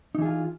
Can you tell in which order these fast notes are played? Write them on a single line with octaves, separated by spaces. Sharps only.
D#4 E3 G#4 F4